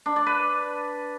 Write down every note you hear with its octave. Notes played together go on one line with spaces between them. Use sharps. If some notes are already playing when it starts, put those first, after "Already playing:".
D4
D5
B4